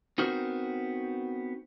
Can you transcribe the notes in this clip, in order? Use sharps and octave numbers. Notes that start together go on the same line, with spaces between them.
B3 C4 D#4 F#4 A#4 C5